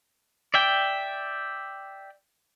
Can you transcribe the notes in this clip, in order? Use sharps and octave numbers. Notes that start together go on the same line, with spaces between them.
D5 E5 G5